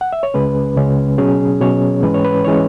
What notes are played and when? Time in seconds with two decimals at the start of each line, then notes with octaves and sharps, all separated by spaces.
0.01 F#5
0.13 E5
0.23 C#5
0.34 C#2 C#3 G#3 C#4 B4
0.77 C#2 C#3 G#3 C#4
1.18 B2 F#3 C#4 G#4
1.61 B2 F#3 C#4 C#5
2.02 G#2 E3 G#3 C#4 B4
2.14 C#5
2.25 B4
2.44 E3 G#3 C#4 C#5